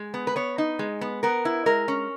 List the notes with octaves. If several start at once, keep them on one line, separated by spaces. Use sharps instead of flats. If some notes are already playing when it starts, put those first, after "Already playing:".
Already playing: G#3
B3
B4
B3 C#5
D#4
G#3
B3
B3 A#4
E4
G#3 A#4
C#4